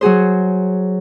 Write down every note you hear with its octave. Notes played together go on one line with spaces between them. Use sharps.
F#3 F#4 G#4 C5